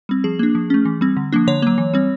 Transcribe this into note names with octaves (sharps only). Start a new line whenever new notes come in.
G3 C4
F3 G#4
A#3 D4
F3
A3 C#4
E3
G3 C4
D3
F3 A#3 D4
D3 C#5
F#3 A#3
E3
G3 C4